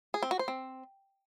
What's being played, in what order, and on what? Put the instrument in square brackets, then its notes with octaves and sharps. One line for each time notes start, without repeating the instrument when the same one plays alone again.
[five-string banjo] G#4
C4
F#4
C5
C4